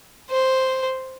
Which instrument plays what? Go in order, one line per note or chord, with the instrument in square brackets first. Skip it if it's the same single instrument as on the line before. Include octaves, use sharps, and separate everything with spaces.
[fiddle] C5